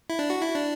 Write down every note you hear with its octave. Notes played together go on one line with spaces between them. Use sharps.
E4
D4
F#4
E4
D4